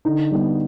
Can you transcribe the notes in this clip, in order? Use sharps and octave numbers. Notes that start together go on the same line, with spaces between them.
D3 D#4
G3 B3